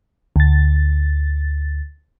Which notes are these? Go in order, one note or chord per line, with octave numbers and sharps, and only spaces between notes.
D2 A6